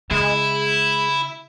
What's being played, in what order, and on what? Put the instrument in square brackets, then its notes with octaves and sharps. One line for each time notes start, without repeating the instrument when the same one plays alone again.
[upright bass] C#3 [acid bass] G#3 [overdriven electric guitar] E4